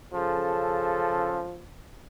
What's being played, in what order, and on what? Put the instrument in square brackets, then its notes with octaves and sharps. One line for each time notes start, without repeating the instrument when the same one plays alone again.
[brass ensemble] C#3 A4 [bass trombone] F3